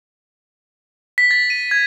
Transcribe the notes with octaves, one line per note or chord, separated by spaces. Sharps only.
B6
A6
D#7
G#6